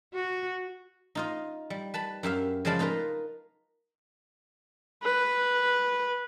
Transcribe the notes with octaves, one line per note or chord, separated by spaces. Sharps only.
F#4
D#4 F4 D#5
G3
B4 A5 B5
F#2 G4 E5 F5
C#3 F3 G#3 D5 A5 B5
D#4 F4 A#4 B4 A#5
B4